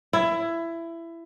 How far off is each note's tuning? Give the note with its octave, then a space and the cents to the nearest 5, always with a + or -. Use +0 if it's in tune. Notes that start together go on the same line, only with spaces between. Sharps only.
E4 +20